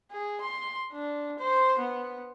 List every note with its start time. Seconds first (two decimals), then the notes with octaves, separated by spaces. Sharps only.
0.11 G#4
0.41 C6
0.92 D4
1.39 C5
1.78 B3